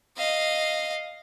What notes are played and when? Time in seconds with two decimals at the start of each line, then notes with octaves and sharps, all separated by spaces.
0.17 D#5 F5